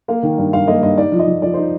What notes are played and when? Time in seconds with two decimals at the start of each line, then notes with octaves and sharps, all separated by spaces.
0.08 A#3 F5
0.23 D#3
0.38 G2
0.53 G2 F5
0.67 A#3 D#5
0.83 G2 D#5
0.98 D#4 D5
1.12 F3
1.19 D#5
1.27 F3
1.42 F3 D5
1.54 D#4 C5